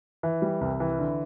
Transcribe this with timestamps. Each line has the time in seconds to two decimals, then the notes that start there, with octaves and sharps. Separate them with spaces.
0.23 E3
0.42 G3
0.61 C2
0.80 E3
0.99 D3